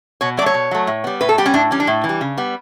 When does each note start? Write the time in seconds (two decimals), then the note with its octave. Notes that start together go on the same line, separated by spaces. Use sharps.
0.21 B2 C#5
0.37 F#3 D5
0.42 A3 C#5
0.54 B2
0.71 F#3 A3
0.87 A2
1.04 G3 B3
1.21 A2 B4
1.29 A4
1.38 G3 B3 G4
1.46 C#4
1.54 A2 D4
1.71 E3 G3 C#4
1.80 D4
1.87 A2
2.04 E3
2.09 G3
2.21 C#3
2.38 G3 B3